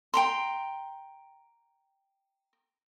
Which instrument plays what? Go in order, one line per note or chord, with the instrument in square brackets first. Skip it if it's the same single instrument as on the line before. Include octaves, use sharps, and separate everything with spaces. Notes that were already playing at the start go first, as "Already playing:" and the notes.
[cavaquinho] G5 A#5 C6